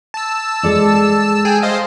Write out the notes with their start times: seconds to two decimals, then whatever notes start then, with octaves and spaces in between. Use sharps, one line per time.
0.14 A5 E6
0.63 G#3 A4 D5
1.45 G#4 G5 G#5
1.62 C5 D#5 F5